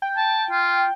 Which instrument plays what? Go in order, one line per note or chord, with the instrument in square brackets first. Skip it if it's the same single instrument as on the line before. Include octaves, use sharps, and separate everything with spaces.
[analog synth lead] G5
[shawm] A5
F4